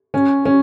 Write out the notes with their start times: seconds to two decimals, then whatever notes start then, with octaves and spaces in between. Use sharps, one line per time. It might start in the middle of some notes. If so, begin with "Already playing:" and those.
0.14 C#4
0.45 C#4